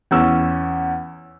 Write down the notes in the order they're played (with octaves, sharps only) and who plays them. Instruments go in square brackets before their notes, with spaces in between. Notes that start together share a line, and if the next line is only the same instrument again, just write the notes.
[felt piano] E2 C#4 E6